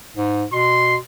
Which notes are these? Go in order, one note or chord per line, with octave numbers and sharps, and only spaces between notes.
G#2
B2 C6